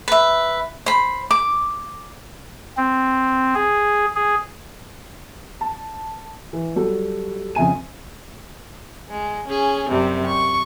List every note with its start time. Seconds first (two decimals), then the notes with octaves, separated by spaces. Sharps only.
0.08 B4 E5
0.86 C5 B5
1.31 D6
2.77 C4
3.55 G#4
4.16 G#4
5.61 A5
6.53 E3
6.76 F#3 G3 F#4 A4
7.55 F2 C#3 E5 G#5 D#7
9.10 G#3
9.47 C#4 G#4
9.89 F#2 C3 G3
10.25 C#6